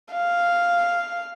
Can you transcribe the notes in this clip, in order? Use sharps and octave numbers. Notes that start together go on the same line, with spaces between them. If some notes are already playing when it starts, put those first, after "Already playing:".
F5